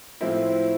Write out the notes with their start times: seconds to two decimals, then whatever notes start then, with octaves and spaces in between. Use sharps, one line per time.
0.21 A2 F3 C4 E4